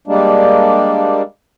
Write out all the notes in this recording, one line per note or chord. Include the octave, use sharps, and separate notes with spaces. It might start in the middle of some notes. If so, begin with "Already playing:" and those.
G3 G#3 A#3 D4